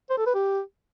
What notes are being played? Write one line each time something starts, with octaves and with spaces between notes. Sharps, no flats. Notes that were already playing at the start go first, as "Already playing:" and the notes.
C5
A4
B4
G4